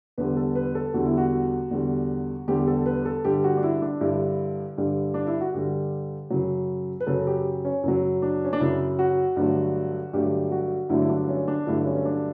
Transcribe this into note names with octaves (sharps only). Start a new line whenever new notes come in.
E2 D3 G3 B4
A4
B4
A4
E2 D3 G3 F#4
E4
F#4
E2 D3 G3
E2 D3 G3 G4
A4
B4
A4
G2 D3 G3 G4
F#4
D4
E4
D4
G2 D3 G3 E4
G2 D3 G3
D4
E4
F#4
G2 D3 G3 G4
F#2 C#3 F#3
B4
F#2 C#3 F#3 A4
G4
C#4
F#2 C#3 F#3
D4
C#4
D4
F#2 C#3 F#3 E4
F#4
G2 D3 F#3 A3
G2 D3 F#3 A3 G4
F#4
G2 D3 F#3 A3 E4
E4
D4
C#4
D4
G2 D3 F#3 A3 E4
C#4
C#4
D4